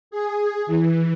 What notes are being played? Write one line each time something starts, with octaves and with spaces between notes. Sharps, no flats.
G#4
E3